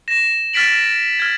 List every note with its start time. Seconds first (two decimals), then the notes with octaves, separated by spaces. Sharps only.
0.08 A#6 E7
0.53 F6 A6 B6 D7 F#7
1.20 F6 G#6